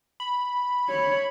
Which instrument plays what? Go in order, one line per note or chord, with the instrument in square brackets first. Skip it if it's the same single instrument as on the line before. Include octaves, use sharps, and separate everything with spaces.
[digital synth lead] B5
[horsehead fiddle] C#5